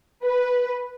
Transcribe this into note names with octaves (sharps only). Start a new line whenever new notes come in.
B4